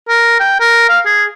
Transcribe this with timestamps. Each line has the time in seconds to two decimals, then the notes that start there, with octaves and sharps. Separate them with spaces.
0.09 A#4
0.40 G5
0.60 A#4
0.89 F5
1.06 G#4